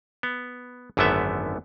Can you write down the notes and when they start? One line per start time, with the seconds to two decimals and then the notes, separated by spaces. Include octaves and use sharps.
0.23 B3
0.97 G#1 F#2 D3 A3 B3 E5